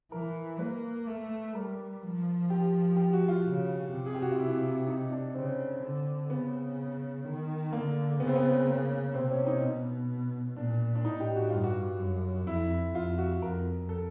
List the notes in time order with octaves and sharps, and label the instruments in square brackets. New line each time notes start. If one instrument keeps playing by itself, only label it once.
[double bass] E3 [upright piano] A#4
[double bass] A#3 [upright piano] B4
[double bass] A3
[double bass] G3 [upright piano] A#4
[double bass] F3
[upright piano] G4
G4
F#4
F4
[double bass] C#3
C3
[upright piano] G#4
G4
F#4
F4
E4
D#4
D4
[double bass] C#3 [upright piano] C4
[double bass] D3
[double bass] C#3 [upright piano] B3
[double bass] D#3
[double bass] D3 [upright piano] A#3
[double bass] C#3 [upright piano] B3
[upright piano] C4
B3
A#3
[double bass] C3 [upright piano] C4
[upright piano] C#4
D#4
[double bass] B2
[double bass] A#2 [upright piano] D4
[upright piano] D4
[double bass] A2 [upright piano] D#4
[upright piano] G4
F#4
[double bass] G2 [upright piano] F4
[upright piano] F#4
[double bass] F#2
[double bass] F2 [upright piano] E4
[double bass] F2 [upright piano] F4
[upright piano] F#4
[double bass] F2 [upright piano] A#4
[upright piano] A4